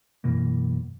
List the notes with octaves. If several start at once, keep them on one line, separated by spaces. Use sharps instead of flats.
F#2 B2 E3 A#3